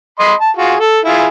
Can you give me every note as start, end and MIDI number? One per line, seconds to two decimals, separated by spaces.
0.19 0.34 75
0.19 0.34 83
0.19 0.34 84
0.40 0.51 81
0.57 0.76 65
0.57 0.76 66
0.57 0.76 68
0.80 1.00 69
1.05 1.27 64
1.05 1.27 65
1.05 1.27 68